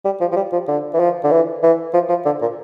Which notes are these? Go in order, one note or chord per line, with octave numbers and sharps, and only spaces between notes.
G3
F3
F3
G3
F3
D3
E3
F3
D3
E3
E3
F3
F3
D3
A#2